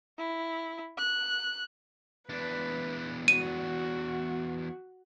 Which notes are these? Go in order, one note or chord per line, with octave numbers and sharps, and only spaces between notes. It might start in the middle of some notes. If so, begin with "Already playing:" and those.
E4
F#6
E2 D4 B4
F#4 D#7